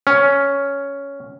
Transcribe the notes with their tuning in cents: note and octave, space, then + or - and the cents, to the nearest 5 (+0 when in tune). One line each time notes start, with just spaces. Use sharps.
C#4 +5